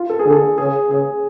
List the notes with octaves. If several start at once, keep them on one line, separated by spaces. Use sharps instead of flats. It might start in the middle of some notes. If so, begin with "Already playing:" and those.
Already playing: F4
A4
G#4
D3
A4
C#3 G#4
C#3 G#4